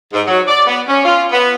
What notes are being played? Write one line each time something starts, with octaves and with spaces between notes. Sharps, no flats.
G#2
F#3
D5
B3
C#4
F4
B3